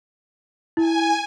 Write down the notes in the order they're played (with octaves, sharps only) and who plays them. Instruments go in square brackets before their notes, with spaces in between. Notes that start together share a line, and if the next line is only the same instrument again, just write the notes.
[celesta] E4 [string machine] G#5